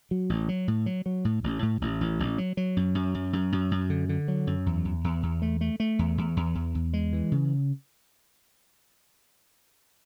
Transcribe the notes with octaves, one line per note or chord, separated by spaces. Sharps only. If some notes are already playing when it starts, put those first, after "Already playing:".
F#3
A1
F#3
A2
F#3
F#3
A2
A1
A2
A1
A1
A1
F#3
F#3
F#2
F#2
F#2
F#2
F#2
F#2
D3
D3
F#3
F#2
E2
E2
E2
E2
A3
A3
A3
E2
E2
E2
E2
E2
G#3
E3
C#3